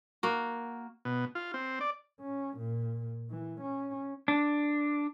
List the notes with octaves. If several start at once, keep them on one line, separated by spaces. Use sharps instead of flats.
A#3 F#4
B2
F4
C4
D5
C#4
A#2
E3
C#4
D4